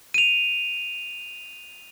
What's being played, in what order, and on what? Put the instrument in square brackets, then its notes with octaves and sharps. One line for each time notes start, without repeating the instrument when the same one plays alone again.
[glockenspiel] D#7 F7